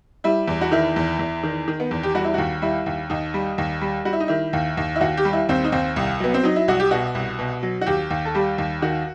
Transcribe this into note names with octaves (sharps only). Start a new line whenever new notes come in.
G3 E4
E2
F#4
D#3 E4
E2
E2
D#3
D#3
B3
E2
G4
G3 F#4
E4
D#2 F#4
G3 E4
D#2
D#2 D#4
G3
D#2
G3
G3 F#4
E4
D#4
D#3 E4
D#2
D#2
E4
D#2 F#4
G4
G3
E4
D#2 C4
D#4
D#2 C4
C2
F#3 B3
C4
F#3 D#4
E4
C2 F#4
G4
B2 F#4
C2
B2
F#3
F#4
D#2 G4
D#2
A4
G3 G4
D#2
D#3 F#4